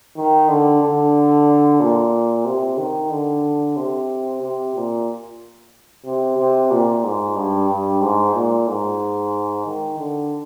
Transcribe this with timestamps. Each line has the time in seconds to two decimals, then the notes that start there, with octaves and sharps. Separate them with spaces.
0.17 D#3
0.49 D3
0.82 D3
1.80 A#2
2.45 C3
2.78 D#3
3.11 D3
3.76 C3
4.42 C3
4.75 A#2
6.05 C3
6.37 C3
6.71 A#2
7.04 G#2
7.36 G2
7.68 G2
8.01 G#2
8.34 A#2
8.68 G#2
9.65 D#3
9.99 D3